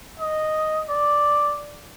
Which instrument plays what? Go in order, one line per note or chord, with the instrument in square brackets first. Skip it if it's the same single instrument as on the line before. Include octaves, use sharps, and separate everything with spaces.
[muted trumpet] D#5
D5